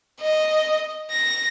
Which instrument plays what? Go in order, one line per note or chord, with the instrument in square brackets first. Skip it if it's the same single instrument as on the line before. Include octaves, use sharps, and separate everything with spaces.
[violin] D#5
A#6